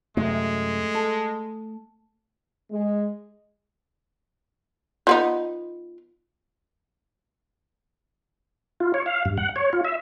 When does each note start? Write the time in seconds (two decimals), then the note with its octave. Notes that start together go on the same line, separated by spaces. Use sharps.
0.17 F#2 C3 G#3 A3
0.95 A4
2.71 G#3
5.07 F3 B3 D#4
8.80 F4
8.94 C#5
9.06 F5
9.25 G2
9.38 F#5
9.56 C#5
9.73 F4
9.85 E5